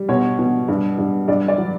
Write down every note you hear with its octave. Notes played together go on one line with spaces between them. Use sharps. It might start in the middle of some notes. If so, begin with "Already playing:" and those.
Already playing: G3
B2 C#5
B2
G2
G2
G2 D5
D5
F#3